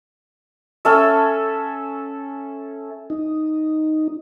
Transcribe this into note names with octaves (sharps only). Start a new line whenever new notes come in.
C#4 A4 E5
D#4